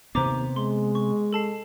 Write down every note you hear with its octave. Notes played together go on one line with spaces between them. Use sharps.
D#2 C3 B3 C5 A#5 D6
G#3 C6
C#6
A4 A5 C7